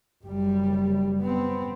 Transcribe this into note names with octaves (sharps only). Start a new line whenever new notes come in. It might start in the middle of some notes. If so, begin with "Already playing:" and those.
F#1 G3
B3 C4